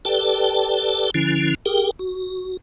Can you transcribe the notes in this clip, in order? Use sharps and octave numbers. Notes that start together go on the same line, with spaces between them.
G4 A4 B4 D5 G5 A5
D3 F3 C#4 E4
G4 G#4 A#4 G5
F#4